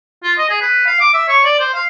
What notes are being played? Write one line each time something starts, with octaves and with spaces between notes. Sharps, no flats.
F4
D#5
G#4
B4
F5
D6
E5
C#5
D5
C5
F5